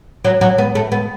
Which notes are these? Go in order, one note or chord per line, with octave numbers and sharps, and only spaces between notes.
F#3
F#3
B3
A3
B3